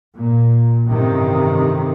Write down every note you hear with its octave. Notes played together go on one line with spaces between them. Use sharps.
A#2
A1 G2 C3 D#3